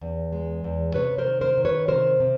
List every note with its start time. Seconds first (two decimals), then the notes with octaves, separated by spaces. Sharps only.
0.01 E2
0.32 G#3
0.64 E2
0.94 C3 B4 C#5
1.18 A#4 C5
1.26 D#3
1.41 A#4 C5
1.58 D#3
1.65 B4 C#5
1.88 C3 A#4 C5
2.20 C3